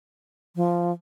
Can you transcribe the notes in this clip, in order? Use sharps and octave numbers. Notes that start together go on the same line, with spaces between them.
F3